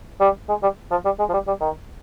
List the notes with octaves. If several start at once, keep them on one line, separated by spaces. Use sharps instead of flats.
G3
G#3
G3
F3
G3
G#3
F3
G3
G3
D#3